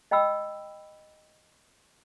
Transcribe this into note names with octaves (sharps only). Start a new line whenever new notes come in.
D#5 G5 B5 D#6 E6